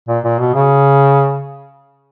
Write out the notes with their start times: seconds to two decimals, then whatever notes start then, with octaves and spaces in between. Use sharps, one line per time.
0.08 A#2
0.24 A#2
0.39 B2
0.54 C#3